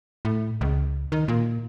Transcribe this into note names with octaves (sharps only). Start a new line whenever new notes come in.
A2
C#2
D#3
A#2